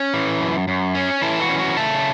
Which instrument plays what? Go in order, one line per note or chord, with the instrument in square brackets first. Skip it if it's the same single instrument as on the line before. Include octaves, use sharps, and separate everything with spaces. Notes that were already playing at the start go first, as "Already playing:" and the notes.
Already playing: [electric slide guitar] C#4
E3
F#2
F#2
C#4
E3 E4 A4
F#4
C#4
F#4
C#3 E5 A5